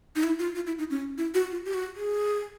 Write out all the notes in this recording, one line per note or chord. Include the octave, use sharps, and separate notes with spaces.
D#4
E4
F4
F4
E4
D#4
C#4
E4
F#4
F4
G4
F#4
G#4